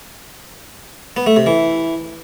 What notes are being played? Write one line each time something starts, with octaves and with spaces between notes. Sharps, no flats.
B3
A3
C3
E3